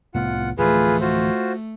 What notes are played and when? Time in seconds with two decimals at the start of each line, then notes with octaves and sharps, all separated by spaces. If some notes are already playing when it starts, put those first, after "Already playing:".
0.14 C2 A2 B3 F4 F#5
0.58 D1 E3 F3 A3 F4 G#4 B4
1.01 F4 F#4 C5